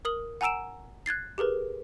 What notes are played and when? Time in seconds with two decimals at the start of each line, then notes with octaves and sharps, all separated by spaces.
0.05 A#4 D#6 F#7
0.41 F#5 G#5 A#5 E6 D7 E7
1.06 F#6 G#6 A6 C7
1.38 G4 G#4 A#4 B4